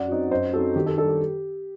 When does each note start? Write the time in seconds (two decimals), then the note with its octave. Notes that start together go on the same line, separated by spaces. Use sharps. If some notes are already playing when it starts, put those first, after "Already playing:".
Already playing: F#2 D5 F#5
0.08 F#3 C4 D#4
0.31 F#2 C5 D#5
0.53 F#3 C4 D#4 A4
0.76 D#3 G4
0.86 A4
0.97 G3 D4 A4
1.08 G4